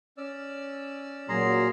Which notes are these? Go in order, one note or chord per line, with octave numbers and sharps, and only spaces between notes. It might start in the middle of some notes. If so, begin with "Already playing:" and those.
C#4 D5 E6
A#2 F#3 G#4 A#5 C6